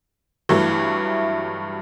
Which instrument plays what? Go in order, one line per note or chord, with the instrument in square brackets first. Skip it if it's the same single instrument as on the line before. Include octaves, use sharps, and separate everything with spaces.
[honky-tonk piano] G2 E3 F#3 A3 E4